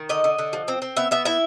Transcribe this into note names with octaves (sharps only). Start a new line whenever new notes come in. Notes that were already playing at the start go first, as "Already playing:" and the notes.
Already playing: D#3
D3 D#5
D3
D3
F3
C4
C4
B3 E5
B3 E5
E4 E5